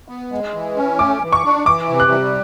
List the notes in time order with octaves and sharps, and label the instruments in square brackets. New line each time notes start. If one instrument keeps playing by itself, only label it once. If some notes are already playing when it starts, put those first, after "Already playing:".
[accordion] B3
G#3
E3
C#4
[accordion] A3 [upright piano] D6
[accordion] E3
[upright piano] C#6
[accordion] D4
[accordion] E3 [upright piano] D6
[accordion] C3
[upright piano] F#6
[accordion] G3